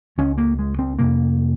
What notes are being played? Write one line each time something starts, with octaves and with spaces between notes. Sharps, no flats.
C#2 C#3 C#4
A#3
G#3
C4
F2 C3 A#3